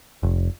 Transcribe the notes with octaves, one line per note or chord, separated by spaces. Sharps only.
F1